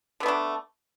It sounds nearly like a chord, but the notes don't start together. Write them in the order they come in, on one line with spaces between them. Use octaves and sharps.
D3 B3 A3 D4